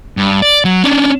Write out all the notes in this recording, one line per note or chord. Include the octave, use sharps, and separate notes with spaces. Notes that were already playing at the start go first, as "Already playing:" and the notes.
G2
D5
F#3
C#4 D4